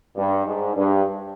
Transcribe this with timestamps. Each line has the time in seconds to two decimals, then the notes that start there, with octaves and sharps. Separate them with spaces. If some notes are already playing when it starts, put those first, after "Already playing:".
0.17 G2
0.47 G#2
0.77 G2